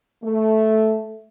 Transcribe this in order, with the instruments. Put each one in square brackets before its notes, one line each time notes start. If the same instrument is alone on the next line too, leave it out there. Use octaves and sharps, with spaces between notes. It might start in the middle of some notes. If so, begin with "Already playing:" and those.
[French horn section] A3